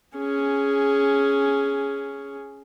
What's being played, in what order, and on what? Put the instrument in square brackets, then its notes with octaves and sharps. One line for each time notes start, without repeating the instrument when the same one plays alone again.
[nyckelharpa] C#4 G#4